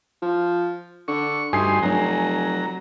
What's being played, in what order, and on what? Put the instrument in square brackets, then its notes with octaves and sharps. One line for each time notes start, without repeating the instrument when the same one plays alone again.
[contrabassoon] F3
[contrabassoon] D3 [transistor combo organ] C#6
[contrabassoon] D2 [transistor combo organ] G2 D#4 C6 [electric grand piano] G#5 C7
[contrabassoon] F1 [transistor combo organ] F#3 A#5